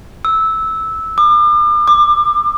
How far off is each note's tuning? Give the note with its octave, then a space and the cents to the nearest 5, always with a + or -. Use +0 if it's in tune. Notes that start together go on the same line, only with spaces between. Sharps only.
E6 -15
D6 +40
D6 +25